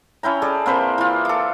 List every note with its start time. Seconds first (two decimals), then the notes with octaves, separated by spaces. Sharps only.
0.23 C#4 E4 G5 A#5
0.42 G#4 A4 D5
0.66 A#3 C4 B4 C5
0.98 E3 F4
1.25 A4 D6